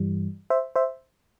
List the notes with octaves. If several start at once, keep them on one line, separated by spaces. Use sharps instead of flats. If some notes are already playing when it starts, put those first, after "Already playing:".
Already playing: G2 E3 G3
C5 E5
C5 E5